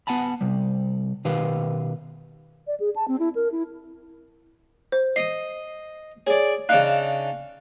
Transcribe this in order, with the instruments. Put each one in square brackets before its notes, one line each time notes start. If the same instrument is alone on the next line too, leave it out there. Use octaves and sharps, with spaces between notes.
[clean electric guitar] B3 F#5 G#5 A5 B5
C3 G3
B2 D#3 G4 B4 F5
[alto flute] D5
G#4
A5
C4
E4
A#4
E4
[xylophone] C5
[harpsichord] D#5 D#6 [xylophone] C7
[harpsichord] G#4 D5 [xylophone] C#5
[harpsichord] C#3 D4 D#4 [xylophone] F5 F#6